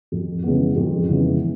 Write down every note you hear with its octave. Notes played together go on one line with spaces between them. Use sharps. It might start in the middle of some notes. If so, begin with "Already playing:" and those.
F2
C#3 E3 G#3 B3
F2
C#3 E3 G#3 B3
E3